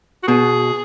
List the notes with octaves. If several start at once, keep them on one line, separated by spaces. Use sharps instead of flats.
F#4
B2 G#4